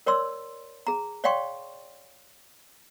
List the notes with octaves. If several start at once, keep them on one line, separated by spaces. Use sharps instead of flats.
A#4 C#5 D5 C6 E6
G#4 A#5
C#5 D5 F5 G5 C6 C#6